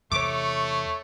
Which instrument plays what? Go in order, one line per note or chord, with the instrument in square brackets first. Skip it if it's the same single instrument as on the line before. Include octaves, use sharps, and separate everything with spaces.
[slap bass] E2 C3 [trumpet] A3 [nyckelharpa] C#5 [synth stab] D6